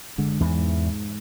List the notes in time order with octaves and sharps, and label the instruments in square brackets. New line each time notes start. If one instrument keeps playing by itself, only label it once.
[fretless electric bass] F#1 D3 G#3
[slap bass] E2 E3 [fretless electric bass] G#2